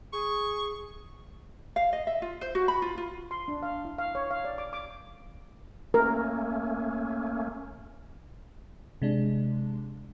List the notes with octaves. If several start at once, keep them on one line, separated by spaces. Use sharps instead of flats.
G#4 C#6
F5
D#5
E5
F4
C5
F#4
B5
F4
F4
C6
D4
F5
E4
F5
C#5
F5
D5
D6
D6
A3 A#3 C#4 A#4
C3 G#3 D4